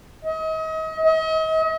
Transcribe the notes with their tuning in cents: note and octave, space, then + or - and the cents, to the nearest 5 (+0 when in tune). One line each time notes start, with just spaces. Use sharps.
D#5 +35
D#5 +40